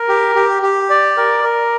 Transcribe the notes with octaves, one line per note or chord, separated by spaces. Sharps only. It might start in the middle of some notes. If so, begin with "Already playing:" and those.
Already playing: A#4
G4
G4
G4
D5
A#4
A#4